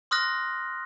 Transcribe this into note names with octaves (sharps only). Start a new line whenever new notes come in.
C6 D#6 F6 F#6 A#6